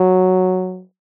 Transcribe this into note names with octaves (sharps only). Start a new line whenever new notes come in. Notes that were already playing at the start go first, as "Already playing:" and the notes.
Already playing: F#3